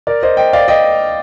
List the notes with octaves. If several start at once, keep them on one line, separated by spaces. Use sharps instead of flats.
A#4 D5
C5 D#5
D#5 G5
D5 F5
D#5 G5